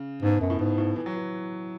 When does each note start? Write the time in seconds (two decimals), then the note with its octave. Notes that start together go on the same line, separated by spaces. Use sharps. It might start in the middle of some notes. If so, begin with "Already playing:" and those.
Already playing: C#3
0.22 G#2 B2
0.41 F#2
0.50 A2
0.59 G#2 B2
0.78 A2
0.96 E3
1.06 F#3
1.16 E3